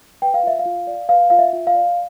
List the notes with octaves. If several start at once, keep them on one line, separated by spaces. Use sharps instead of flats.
B4 G5
F5
F4 E5
F5
F4
D5
B4 F5
F4 F5
E5
F4
F5
D5